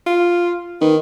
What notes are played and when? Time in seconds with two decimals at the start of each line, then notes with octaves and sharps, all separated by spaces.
0.07 F4
0.82 D#3 B4